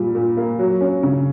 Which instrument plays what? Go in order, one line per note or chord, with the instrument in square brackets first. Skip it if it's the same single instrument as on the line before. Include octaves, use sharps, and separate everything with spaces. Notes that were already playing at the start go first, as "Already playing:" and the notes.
Already playing: [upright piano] A#2 G3
A#2
A#3
F#3
C#4
C#3